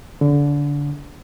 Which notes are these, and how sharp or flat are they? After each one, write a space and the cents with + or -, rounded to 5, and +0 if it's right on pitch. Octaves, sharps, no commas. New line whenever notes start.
D3 -25